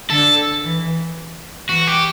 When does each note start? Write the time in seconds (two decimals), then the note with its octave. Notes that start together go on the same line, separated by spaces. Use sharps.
0.10 D3 A4
0.64 E3
1.69 E3 F#4
1.87 G4